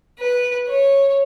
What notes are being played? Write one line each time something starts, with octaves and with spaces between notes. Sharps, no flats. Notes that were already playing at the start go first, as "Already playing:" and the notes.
B4
C#5